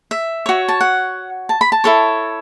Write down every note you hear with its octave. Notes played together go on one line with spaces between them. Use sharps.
E5
F#4 C#5
A5
F#5
A5
B5
A5
E4 A4 C#5